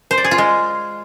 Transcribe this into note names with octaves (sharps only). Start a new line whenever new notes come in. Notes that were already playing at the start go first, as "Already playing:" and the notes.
C5
D5
G#4
F4
G#3